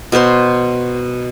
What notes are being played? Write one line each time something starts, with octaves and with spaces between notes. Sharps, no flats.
B2 A#4 C5 C6